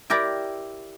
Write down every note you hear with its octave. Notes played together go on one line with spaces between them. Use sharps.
E4 G4 A#4 D5